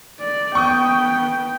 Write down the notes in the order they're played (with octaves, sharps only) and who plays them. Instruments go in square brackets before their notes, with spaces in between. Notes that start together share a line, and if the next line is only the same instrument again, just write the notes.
[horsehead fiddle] D5
[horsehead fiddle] B3 G5 [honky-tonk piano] C#6 D#6